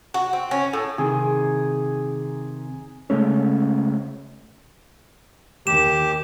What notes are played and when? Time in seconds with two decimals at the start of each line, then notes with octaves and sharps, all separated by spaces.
0.14 F#4
0.33 C4
0.51 C#4
0.73 A2
0.98 C3 D#3 G#4
3.10 C#3 G#3 A3 C#4
5.67 D#2 G4 E7